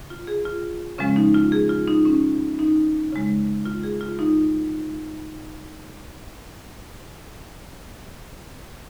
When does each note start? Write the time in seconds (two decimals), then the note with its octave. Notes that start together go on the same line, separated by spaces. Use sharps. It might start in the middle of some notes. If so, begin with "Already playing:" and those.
Already playing: C#3
0.10 F4
0.27 G#4
0.45 F4
0.98 C#3 F3 G#3 C#4
1.16 D#4
1.35 F4
1.52 G#4
1.69 F4
1.88 D#4
2.05 C#4
2.59 D#4
3.12 C#3 G#3
3.66 F4
3.83 G#4
4.01 F4
4.19 D#4